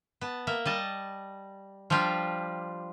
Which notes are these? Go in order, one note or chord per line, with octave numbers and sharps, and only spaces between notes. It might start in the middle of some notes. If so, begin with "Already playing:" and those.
B3 A5
A#3 E5
G3 D#5 A5
F3 G3 D4 F4 G4